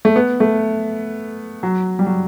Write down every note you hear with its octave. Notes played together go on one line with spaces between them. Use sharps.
A3
B3
A3
F#3
G3
F#3